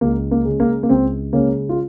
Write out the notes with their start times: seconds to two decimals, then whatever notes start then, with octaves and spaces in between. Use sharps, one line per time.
0.01 C#2 A#3
0.31 A#3
0.45 C#3 G#3
0.60 A#3
0.83 A#3
0.89 C#2 C4
1.33 C#3 G#3 A#3 C#4
1.69 F4